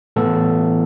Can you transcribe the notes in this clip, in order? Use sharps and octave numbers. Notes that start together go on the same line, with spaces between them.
A2 E3 B3 A4